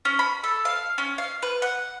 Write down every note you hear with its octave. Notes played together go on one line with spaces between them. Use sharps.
C#4
B5
A4
F5
C#4
F5
B4
F#5